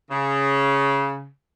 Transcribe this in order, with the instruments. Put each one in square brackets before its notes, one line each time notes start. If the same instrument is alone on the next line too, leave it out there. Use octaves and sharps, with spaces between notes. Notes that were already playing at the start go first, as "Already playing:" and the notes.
[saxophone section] C#3